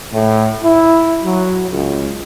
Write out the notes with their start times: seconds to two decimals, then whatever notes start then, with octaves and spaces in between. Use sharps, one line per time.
0.12 A2
0.63 E4
1.23 F#3
1.70 C#2